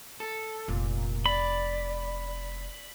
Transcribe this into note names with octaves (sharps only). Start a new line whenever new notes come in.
A4
F1 A#2
D5 B5